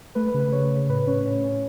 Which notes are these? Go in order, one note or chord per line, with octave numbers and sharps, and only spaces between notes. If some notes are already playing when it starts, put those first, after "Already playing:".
A3 B4
B4
C#3
B4
C#3 C#5
C#3
A2 B4
C#4 C#5
A2 C#5
C#4